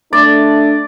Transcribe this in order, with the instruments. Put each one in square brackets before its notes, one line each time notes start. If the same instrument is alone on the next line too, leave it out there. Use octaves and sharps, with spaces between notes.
[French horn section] A3 D4 [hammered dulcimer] D5